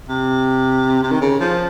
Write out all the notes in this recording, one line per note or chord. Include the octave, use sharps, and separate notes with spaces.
C3
C3
D#3
C#3
F3